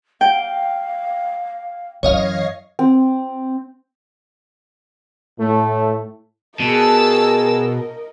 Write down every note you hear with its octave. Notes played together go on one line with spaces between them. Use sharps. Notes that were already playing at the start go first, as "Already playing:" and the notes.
F5 G5
F#2 E3 C#5 D#5 F5
C4
A2 A3
B2 G#4 A#4 D#5 A5 E6